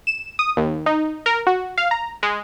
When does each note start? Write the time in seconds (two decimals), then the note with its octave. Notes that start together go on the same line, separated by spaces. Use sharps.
0.07 E7
0.39 D#6
0.57 D#2
0.86 D#4
1.26 A#4
1.47 F#4
1.78 F5
1.91 A#5
2.23 G#3